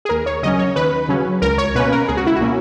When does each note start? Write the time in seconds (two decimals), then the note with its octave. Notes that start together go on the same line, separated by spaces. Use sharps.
0.05 G#4
0.09 D#2 A#4
0.26 C#5
0.43 C#3 F#3 C#4 D#5
0.59 C#5
0.76 D#2 B4
1.09 C#3 F#3 C#4
1.42 C#2 A#4
1.58 C#5
1.75 B2 A#3 C#4 B4
1.92 A#4
2.08 C#2 G#4
2.17 F#4
2.27 E4
2.36 F#4
2.41 B2 A#3 C#4